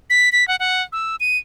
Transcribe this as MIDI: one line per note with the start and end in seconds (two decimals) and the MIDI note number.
0.10 0.29 95
0.32 0.47 95
0.48 0.56 78
0.60 0.82 78
0.92 1.16 88
1.20 1.38 99